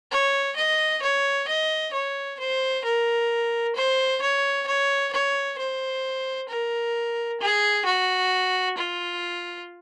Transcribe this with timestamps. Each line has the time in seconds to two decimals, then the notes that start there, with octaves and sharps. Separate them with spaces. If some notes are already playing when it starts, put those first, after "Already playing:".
0.12 C#5
0.56 D#5
1.02 C#5
1.48 D#5
1.93 C#5
2.39 C5
2.84 A#4
3.76 C5
4.22 C#5
4.67 C#5
5.13 C#5
5.58 C5
6.49 A#4
7.41 G#4
7.86 F#4
8.77 F4